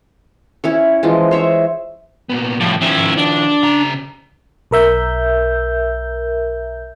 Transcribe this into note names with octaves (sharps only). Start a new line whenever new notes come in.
C#4 E4 C#5
E3 F3 G#3
C5 C#5 E5
A#2 B3
A2 F3 G3
D#3 F3 C#4 E5
D4
C#3 A#5
B1 A#4 E5 G6